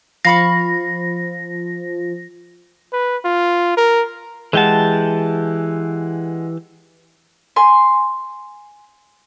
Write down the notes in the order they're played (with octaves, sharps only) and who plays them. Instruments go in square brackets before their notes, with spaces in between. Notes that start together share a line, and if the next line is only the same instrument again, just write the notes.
[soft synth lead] F3 [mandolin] F5 B5 C#6 [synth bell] A#6
[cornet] B4
F4
A#4
[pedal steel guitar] E3 G4 A5 [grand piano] G#3 F#5
[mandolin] G#5 C6